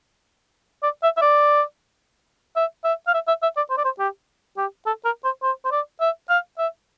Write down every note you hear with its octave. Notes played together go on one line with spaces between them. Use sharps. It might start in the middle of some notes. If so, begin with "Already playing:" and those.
D5
E5
E5
D5
E5
E5
F5
E5
E5
E5
D5
C5
D5
C5
G4
G4
A4
A#4
C5
C5
C5
D5
E5
F5
E5